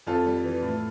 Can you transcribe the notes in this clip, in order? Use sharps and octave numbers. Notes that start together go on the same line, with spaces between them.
F2 F4 A4
G3
E3
A2